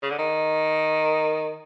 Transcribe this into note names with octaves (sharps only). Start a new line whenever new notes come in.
C#3
D3
D#3